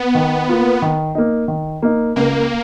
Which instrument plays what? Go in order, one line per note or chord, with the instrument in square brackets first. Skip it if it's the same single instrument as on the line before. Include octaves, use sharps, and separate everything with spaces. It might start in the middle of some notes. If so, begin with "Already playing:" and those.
Already playing: [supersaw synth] B3
[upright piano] D#3
A#3 F4 B4
D#3
A#3 D#4
D#3
A#3 D#4
[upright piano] C#2 [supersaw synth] A#3